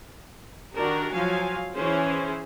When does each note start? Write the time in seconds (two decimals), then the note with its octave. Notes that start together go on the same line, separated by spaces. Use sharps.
0.75 D#3 D4 F#4 G4 A#4
1.12 F3 F#3 F5 G#5
1.74 E3 C#4 G#4 C5